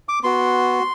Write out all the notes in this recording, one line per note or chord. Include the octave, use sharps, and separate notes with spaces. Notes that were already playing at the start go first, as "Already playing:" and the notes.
D6
B3 F#4 C6